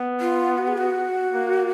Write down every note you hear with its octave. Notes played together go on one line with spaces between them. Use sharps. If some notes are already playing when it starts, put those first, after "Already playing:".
Already playing: B3
F4
F#4
G#4
F#4
A#3